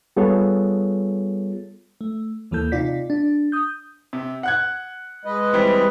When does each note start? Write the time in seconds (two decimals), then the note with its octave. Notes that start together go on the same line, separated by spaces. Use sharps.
0.16 G3 B3 F4 G#4 A4 C#5
2.01 A3
2.51 D#2 E3 A#3 A4 G6
2.72 C3 D#4 F4 D5 B6
3.10 D4
3.52 D#6 G6
4.13 C3
4.43 F#5 F#6 G#6
5.25 G#3 B4 D#5
5.53 E3 G3 C4